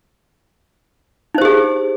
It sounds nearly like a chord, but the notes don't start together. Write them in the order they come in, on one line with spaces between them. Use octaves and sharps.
D#4 C5 G4 G#4